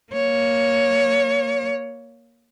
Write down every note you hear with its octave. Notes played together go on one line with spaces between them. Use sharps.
A#3 C#5